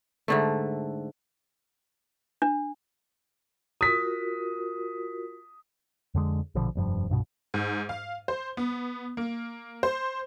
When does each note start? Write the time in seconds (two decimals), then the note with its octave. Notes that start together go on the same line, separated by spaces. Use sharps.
0.28 G#2 D3 A3
2.42 D4
3.81 F4 F#4 A#4 D#6 B6
6.14 F2 D3 G#3
6.55 A#1 B2 D3 F3
6.75 F1 G2 F3
7.09 C2 G2 B2
7.54 G#2
7.89 F5
8.28 C5
8.57 B3
9.17 A#3
9.83 C5